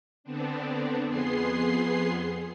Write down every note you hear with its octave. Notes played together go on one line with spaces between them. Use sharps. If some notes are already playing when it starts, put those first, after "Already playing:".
D3 B3 C4 D4
F2 B3 G#4 C6 C7